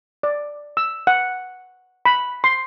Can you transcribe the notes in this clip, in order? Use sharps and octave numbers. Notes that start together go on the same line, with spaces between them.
D5
E6
F#5
B5
C6